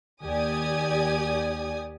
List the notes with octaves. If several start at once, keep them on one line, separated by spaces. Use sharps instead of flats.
D#2 G4 D5 G#5 D#6 G#6